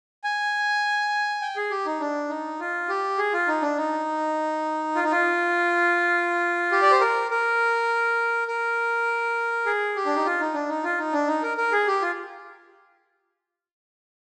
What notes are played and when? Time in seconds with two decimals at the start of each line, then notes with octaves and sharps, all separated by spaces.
0.24 G#5
1.42 G5
1.56 G#4
1.71 G4
1.86 D#4
2.00 D4
2.29 D#4
2.60 F4
2.89 G4
3.18 G#4
3.34 F4
3.48 D#4
3.62 D4
3.77 D#4
4.95 F4
5.04 D#4
5.12 F4
6.72 G4
6.82 D5
6.91 C5
7.01 A#4
7.31 A#4
8.48 A#4
9.66 G#4
9.96 G4
10.06 D4
10.16 D#4
10.25 F4
10.40 D#4
10.54 D4
10.69 D#4
10.84 F4
10.98 D#4
11.13 D4
11.27 D#4
11.42 A#4
11.57 A#4
11.72 G#4
11.87 G4
12.02 F4